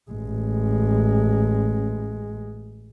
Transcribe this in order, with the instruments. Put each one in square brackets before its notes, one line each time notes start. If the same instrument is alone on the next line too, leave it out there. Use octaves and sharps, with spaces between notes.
[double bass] A1 G#3